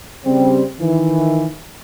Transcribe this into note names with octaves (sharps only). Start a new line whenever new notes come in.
C#3 G3 C4
D#3 E3